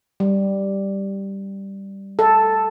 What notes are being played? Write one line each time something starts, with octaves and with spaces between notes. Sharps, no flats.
G3
A4